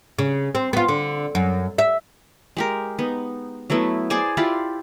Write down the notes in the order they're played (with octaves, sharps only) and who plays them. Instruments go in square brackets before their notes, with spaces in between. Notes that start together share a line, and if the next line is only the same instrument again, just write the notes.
[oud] C#3
C4
B3 F4
D3
F#2
E5
[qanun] G#3 G4 A#4
B3 D#4
F#3 A3 B3 E4
G#4 C5 D5 G#5
E4 F4 G4 D5